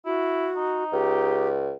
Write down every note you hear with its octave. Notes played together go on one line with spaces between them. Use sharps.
E4 F#4
D#4
C#2 G4